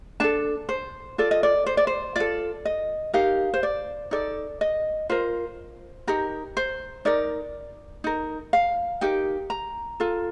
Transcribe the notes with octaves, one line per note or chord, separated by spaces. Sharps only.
D4 A4 A5
C5
F4 A4 D5
D#5
D5
C5
D5
C5
F4 A4 D5
D#5
D#4 G4 A#4 F5
C5
D5
D#4 A4 D5
D#5
F4 A#4 C5
D#4 G4 A#4
C5
D#4 A#4 D5
D#4 A#4
F5
D#4 G4 A#4 G5
A#5
F4 A4